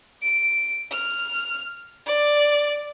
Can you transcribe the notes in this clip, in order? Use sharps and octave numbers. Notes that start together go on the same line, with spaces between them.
D7
F6
D5